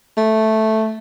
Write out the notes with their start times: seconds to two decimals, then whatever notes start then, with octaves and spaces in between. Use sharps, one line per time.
0.17 A3